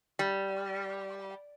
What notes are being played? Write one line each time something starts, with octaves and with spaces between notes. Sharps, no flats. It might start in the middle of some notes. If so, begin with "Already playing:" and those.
G3